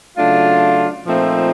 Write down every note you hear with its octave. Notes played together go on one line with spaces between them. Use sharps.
C#3 F#3 A3 D4 F4
A#2 F3 A3 C4 D#4